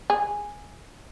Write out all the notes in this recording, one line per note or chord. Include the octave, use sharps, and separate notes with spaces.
G#4